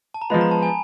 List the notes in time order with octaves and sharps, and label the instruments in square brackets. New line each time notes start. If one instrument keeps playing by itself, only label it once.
[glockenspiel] A5
A#5
[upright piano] F3 G#3 B3 [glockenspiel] B5
[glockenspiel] A#5
A5
G#5